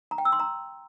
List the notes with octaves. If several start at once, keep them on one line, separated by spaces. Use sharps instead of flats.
A#5
G5
E6
C6
A#5